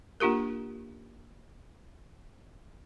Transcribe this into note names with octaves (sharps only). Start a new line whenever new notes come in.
A#3 D4 F4 G4 A#4